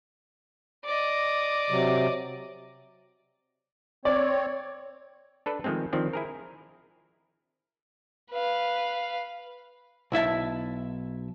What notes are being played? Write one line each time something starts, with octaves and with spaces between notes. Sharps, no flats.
D5 D#5
C3 F#3
C4 C#5 D5
D4 A4 B4 D5
D#3 F3 G#3 A3 C4
D#3 F3 C4 D4
E4 G#4 A#4
B4 F5
B1 E4 E5 A5